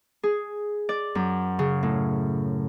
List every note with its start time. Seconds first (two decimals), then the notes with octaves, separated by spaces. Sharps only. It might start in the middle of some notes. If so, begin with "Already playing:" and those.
0.23 G#4
0.89 D5
1.15 F#2
1.59 C#3
1.83 A2